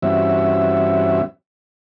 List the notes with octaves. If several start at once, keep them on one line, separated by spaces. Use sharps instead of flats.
G2 E3 C4 C#4 F#4 E5